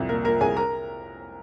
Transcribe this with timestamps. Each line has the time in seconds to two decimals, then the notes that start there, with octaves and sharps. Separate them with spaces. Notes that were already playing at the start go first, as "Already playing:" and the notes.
Already playing: C2 F2
0.09 A#2 A#4
0.25 A#2 A#4
0.41 C2 G#4 G#5
0.57 A#4 A#5